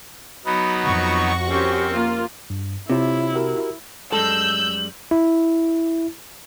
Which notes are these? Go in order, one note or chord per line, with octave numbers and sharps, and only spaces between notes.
F#3 B3 D#4 B5
F2 F#4 C#6
C4 C#4 G4 A#4 C5
A#3 F4
G2
C3 E4 F4 C#5
F#4 G4 A#4
F#2 G3 G#3 A4 E6 G6 F#7
E4